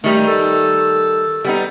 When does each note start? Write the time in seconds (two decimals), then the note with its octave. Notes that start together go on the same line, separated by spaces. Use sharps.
0.04 D#3 G3 A3 D#4
0.28 A4
1.45 G3 B3 D#4